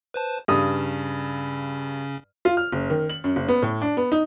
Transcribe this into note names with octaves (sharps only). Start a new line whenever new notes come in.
B4 C5 A5
G2 C#3 C#4 D#6
F4
F6
F#1
D#3
F#7
F#2
F#1
B3
A2
D4
B3
D#4